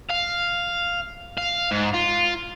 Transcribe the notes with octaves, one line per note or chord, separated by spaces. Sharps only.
F5
F5
G#2
F4